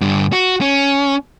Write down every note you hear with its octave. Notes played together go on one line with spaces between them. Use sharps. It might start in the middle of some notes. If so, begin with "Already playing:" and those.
G2 D3
F#4
C#4